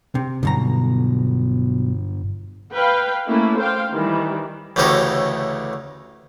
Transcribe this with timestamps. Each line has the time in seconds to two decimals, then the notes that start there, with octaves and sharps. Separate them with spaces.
0.15 C3
0.43 B1 G2 B2 D3 A#5
2.73 B4 F5 G5
3.26 A3 A#3 C#4 E4
3.59 C5 F5 G5
3.93 D#3 E3 G3
4.76 A1 D2 A2 C#3 D#4 G4